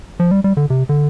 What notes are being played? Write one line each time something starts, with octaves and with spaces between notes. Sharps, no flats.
F3
G3
G3
D3
C3
D3